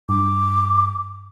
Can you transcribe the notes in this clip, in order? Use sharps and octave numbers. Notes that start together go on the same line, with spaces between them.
G2 D6